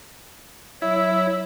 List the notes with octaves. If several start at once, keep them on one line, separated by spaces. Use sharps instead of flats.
F#3 E4 C#5 E5